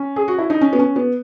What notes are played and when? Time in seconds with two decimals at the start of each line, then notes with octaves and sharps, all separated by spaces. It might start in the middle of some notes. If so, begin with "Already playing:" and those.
Already playing: C#4
0.16 G#4
0.28 F#4
0.38 E4
0.50 D#4
0.61 C#4
0.73 B3
0.79 C#4
0.96 B3